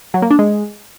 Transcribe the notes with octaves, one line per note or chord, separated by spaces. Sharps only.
F#3
A#3
D4
G#3